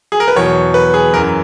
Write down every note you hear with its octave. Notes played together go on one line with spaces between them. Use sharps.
G#4
A#4
B4
E2 B2 F#3 C#5
B4
G#4
F#2 E3 A#4